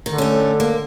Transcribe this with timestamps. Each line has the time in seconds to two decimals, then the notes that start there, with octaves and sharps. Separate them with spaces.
0.06 D3 D#3
0.18 A3 C#4
0.60 A#3